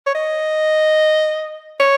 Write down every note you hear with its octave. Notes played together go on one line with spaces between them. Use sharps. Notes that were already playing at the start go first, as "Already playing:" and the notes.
C#5
D#5
C#5